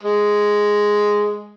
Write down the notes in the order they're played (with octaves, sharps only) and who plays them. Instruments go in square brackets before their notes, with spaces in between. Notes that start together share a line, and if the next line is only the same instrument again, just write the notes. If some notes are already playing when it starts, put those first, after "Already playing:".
[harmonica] G#3